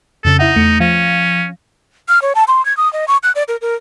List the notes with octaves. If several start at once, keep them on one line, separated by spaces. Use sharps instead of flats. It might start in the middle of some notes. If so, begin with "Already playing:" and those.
F2 C#3 A4
D#4 E4 E5 F#5
E2 A3 C#7
F3 C#4 F5 A#6
F6
C#5
A5
C6
G#6
D#6
D#5
C#6
F#6
D5
A#4
A#4